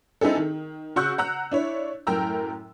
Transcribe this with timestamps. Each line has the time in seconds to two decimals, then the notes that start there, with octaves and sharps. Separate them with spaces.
0.21 C4 D#4 E4 G#4 A4
0.37 D#3
0.96 C#3 F#4 F#5 C#6 E6 G6
1.18 F#5 A#5 E6 F#6
1.52 D4 E4 C#5
2.07 F#2 A2 A#4 G5 A#5 E6